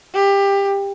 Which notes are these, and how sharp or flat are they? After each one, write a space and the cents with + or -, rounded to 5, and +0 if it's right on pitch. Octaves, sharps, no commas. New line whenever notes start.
G4 +20